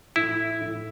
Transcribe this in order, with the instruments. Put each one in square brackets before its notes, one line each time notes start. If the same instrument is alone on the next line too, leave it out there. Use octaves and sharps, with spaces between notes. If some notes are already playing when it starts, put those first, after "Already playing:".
[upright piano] A2 [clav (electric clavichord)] E4
[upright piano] A2